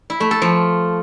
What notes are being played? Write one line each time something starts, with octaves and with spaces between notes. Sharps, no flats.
E4
A3
A4
F3